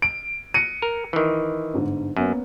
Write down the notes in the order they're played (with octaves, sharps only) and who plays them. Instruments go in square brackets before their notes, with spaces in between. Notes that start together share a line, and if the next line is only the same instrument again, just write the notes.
[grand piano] D7
[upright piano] F#6 A#6 [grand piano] C#7 D#7
[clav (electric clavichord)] A#4
D#3 E3
[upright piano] G1 G#2 D3
[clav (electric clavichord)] F#2 [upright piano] A#3 B3 C#4